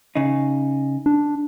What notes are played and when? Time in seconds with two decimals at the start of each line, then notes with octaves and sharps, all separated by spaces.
0.15 C#3 D#4
1.06 D4